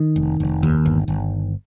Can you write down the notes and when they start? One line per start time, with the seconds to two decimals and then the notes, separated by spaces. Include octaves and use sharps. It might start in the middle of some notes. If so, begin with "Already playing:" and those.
Already playing: D#3
0.16 F1
0.40 F1
0.63 D#2
0.85 G1
1.08 G1